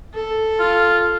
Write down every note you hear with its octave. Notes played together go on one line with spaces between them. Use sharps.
A4
F4